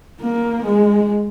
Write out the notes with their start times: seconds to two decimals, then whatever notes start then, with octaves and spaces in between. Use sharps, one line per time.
0.21 A#3
0.65 G#3